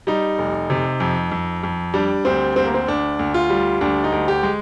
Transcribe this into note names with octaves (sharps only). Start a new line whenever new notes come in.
G3 D#4
F1
C3
F2
F2
F2
G3 D4
D2 C4
D2 C4
A#3
C4
D2 D4
D2
F4
G3
D2 D4
D#4
D2
G4
G#3